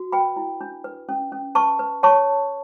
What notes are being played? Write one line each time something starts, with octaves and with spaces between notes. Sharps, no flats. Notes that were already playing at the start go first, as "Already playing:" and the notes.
Already playing: F#4
B4 G5 B5
E4
D4
B4
C#4
C#4
B4 A5 C#6
B4
C#5 A5 C#6